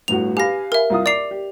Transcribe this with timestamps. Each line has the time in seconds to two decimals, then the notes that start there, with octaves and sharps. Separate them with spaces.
0.08 G1 A2 F#4 F7
0.37 G4 B4 F5 G#5 A#6
0.72 A#4 E5
0.90 C2 F4 D#6
1.06 D5 D6 C7 F7
1.31 G4